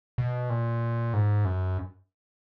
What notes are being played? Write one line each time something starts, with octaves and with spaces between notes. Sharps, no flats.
B2
A#2
G#2
F#2